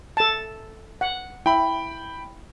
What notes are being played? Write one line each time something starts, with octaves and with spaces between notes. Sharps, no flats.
A4 A5
F#5
E4 G5 B5